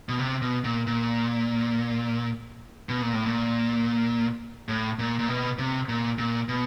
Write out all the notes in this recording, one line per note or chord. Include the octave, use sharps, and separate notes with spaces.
B2
C3
B2
A#2
A#2
B2
A#2
A2
A#2
A2
A#2
A#2
B2
C3
A#2
A#2
B2